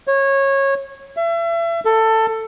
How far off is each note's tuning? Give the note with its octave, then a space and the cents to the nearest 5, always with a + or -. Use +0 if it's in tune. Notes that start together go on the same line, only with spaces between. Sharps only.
C#5 -20
E5 +35
A4 +15